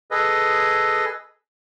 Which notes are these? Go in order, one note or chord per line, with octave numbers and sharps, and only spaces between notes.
G#4 A4 B4 D#5